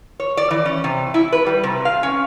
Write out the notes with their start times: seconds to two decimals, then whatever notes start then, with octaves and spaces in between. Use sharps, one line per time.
0.20 C#5
0.37 D5
0.51 E3
0.66 C#4
0.84 C3
1.14 E4
1.32 B4
1.46 G3
1.63 C3
1.85 F5
2.03 C#4